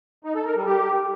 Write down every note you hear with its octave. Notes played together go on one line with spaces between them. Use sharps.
D#4
A4
A#4
G3
G4